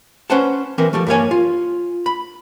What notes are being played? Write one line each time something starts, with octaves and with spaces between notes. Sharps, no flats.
C#4 B4 C5 F#5 A5
E3 C4 A#4 B4
F3 G3 A3
G2 G3 A#3 C4 C#5 G#5
F4
B5